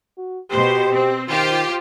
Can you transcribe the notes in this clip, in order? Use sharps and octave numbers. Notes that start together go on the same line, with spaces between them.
F#4
B2 G4 C5
C4
D#3 F4 G4 C5